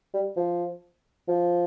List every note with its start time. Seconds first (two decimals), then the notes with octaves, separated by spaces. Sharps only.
0.14 G3
0.36 F3
1.28 F3